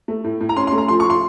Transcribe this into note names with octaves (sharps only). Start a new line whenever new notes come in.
A3
A2
A2
A#5
C#4 C6
C6
A3
A#5
F3 C6
C#6
F3 C6